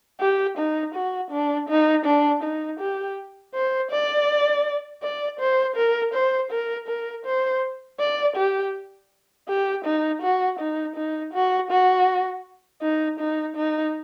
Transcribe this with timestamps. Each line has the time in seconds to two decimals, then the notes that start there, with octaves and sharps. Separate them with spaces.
0.20 G4
0.57 D#4
0.94 F#4
1.31 D4
1.69 D#4
2.05 D4
2.43 D#4
2.80 G4
3.54 C5
3.91 D5
5.03 D5
5.39 C5
5.76 A#4
6.14 C5
6.51 A#4
6.88 A#4
7.25 C5
7.99 D5
8.36 G4
9.48 G4
9.85 D#4
10.22 F#4
10.60 D#4
10.96 D#4
11.33 F#4
11.70 F#4
12.82 D#4
13.19 D#4
13.56 D#4